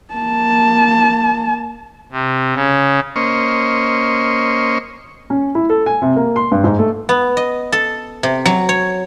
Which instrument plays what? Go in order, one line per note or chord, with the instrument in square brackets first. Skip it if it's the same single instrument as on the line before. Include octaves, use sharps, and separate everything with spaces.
[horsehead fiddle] A#3 A5
[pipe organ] C3
C#3
[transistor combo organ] A#3 C#4 C5 D#5 C#6
[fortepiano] C#4
E4
A4
G#5
C3
A#3
C6
G2
G#2
A3
[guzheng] B3
D#5
A4
C3
F#3
C#5